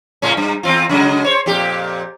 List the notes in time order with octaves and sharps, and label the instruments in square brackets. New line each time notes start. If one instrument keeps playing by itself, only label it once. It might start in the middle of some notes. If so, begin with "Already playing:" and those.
[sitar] A2 C#3 C#4
G2
E2 C4 F4
C#3 F#3 G#3
C5 C#5
F2 A#2 G4